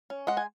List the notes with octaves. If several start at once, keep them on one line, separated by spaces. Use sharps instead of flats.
C#4
G#3 D#5 F#5
G#5